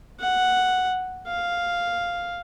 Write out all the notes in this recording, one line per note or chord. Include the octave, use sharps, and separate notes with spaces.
F#5
F5